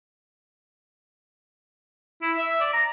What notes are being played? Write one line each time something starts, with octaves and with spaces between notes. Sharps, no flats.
E4
E5
D5
A#5